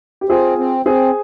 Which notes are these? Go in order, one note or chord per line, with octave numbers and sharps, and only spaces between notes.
G4
C4 F4 G#4
C4
C4 G#4 C5